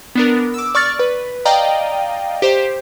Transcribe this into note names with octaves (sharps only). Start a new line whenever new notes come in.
B3 D4 A#4
D6 E6
D5 C#6 F6 A6
B4
D5 D#5 F5 G5 A#5
G4 C5